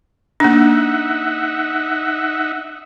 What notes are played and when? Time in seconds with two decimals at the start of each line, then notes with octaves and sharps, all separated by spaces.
0.40 A#3 D4 D#4 E5 F#5